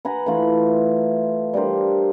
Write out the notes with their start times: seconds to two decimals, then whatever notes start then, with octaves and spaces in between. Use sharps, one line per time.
0.05 B4 F#5 G#5 A#5
0.26 E3 A3 F4 B5
1.53 G3 D4 A#4 C5